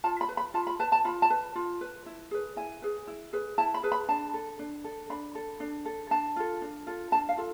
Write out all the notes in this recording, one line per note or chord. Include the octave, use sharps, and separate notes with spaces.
F4 A5
B5
B4
B5
F4 A5
B5
B4 A5
A5
F4 B5
A5
B4
F4
B4
E4
G#4 B4
E4 G#5
G#4 B4
E4
G#4 B4
E4 A5
B5
G#4 B4
B5
D4 A5
A4
D4
A4
D4 B5
A4
D4
A4
D4 A5
F4 A4
D4
F4 A4
D4 A5
F5
F4 A4